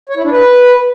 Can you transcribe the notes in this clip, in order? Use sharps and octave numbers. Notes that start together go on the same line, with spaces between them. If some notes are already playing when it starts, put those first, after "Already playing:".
C#5
E4
D4
B4